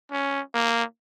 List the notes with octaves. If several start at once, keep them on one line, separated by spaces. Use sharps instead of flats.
C#4
A#3